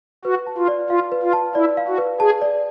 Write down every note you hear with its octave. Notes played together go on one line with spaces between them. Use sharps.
F#4 B4
A5
F4
D5
F4 F5
B4
F4
A5
E4 D5
F5
F#4
B4
G#4 A5
D5